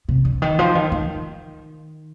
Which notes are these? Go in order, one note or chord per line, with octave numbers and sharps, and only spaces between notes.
C3
D3
D#3
F3
D#3
D#3